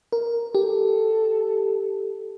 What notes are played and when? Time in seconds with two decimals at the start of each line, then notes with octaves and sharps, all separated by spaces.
0.12 A#4
0.55 G4 A4